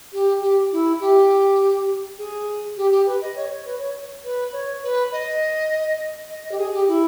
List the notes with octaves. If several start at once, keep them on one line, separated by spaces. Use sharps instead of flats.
G4
G4
E4
G4
G#4
G4
G4
B4
D#5
C#5
C#5
B4
C#5
B4
C#5
B4
D#5
D#5
D#5
G4
G#4
G4
E4